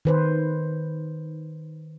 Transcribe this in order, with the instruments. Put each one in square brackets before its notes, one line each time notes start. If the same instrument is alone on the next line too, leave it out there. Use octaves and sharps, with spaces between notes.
[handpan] D#3 B4 C5